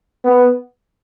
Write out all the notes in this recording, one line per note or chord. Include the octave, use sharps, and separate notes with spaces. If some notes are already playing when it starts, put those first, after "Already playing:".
B3